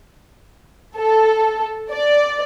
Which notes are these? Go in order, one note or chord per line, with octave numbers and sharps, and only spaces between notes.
A4
D5